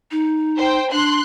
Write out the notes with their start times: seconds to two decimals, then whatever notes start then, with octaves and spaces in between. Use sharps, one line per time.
0.11 D#4
0.58 C5 G5
0.92 D4 C6 F#6